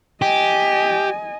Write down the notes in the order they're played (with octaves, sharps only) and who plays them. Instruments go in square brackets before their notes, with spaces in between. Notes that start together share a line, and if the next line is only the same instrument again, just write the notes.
[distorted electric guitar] G4 [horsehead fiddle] D#5 G#5